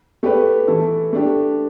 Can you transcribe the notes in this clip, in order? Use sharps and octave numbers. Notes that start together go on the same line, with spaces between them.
A3 G4 B4
E3 A3 E4 A4
A3 D4 G4